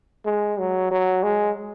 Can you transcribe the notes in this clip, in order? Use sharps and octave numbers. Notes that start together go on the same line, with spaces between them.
G#3
F#3
F#3
G#3